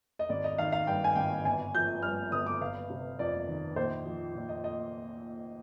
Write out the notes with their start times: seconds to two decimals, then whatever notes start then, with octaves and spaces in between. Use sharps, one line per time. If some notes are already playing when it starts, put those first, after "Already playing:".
0.19 D#5
0.29 G#1 D5
0.44 D#5
0.58 D#3 F5
0.72 F5
0.87 G2 G5
1.04 G#5
1.16 G#1 G5
1.45 G1 G#5
1.75 F3 G6
2.03 G2 F6
2.32 G1 D#6
2.46 D6
2.61 G1 F5
2.90 C3
3.19 F2 D5
3.48 D#3
3.76 A#1 C5
4.05 F3
4.35 A#2
4.49 D#5
4.64 D#5